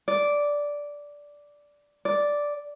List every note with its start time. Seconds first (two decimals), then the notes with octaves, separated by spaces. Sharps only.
0.08 D5
2.05 D5